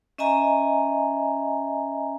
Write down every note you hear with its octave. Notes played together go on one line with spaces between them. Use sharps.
C#4 D#5 E5 G#5 A#5